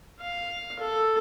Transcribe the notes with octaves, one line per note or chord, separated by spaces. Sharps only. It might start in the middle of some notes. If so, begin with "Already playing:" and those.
F5
A4